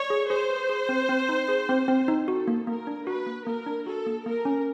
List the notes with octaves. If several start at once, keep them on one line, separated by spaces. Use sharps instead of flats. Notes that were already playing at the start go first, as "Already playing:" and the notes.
Already playing: C#5 D5
G#4
G#4 C5
B4
G#4
C4
C4
D#4
G#4
C4
C4
D#4
F#4 A4
A#3
A#3 A#4
D4
F#4 B4
A#3
A#3 A#4
D4
F#4 A4
A#3
A#3 A#4
C#4